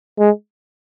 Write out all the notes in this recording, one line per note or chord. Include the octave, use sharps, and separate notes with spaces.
G#3